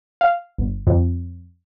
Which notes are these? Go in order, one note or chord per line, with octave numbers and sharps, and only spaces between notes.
F5
G1
F2